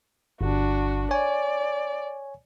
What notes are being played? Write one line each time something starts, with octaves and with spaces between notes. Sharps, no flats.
G1 D4 F#4
C#5 D5 G#5